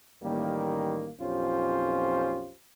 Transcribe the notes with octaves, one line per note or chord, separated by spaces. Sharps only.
A1 D#3 G3 A#3
B1 F2 C#4 F4 G4 C5